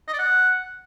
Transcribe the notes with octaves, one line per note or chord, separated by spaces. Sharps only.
D#5
D5
F#5